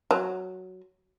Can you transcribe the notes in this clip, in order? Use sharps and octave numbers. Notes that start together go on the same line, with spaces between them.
F#3